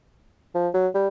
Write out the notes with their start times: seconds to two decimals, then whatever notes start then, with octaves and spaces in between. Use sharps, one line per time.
0.55 F3
0.74 F#3
0.95 G3